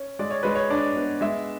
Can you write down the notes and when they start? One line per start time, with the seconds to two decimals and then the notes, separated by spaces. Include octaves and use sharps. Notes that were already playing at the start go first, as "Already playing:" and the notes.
Already playing: C#4
0.19 G#3 D5
0.31 C#5
0.43 G#3 B4
0.55 C#5
0.70 D4 D5
0.96 B3
1.21 G#3 E5